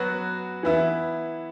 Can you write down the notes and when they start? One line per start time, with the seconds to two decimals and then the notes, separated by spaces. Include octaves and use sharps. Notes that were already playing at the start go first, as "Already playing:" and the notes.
Already playing: F#3 B3 F#4
0.63 E3 B3 E4